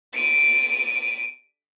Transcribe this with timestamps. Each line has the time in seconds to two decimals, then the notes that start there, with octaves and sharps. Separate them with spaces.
0.14 D7 D#7